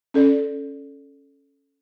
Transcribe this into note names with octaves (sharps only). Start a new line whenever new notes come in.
C#4 A4 D5